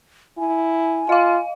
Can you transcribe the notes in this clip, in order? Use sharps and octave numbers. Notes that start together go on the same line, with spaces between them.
E4 G#5
F4 D#5 F5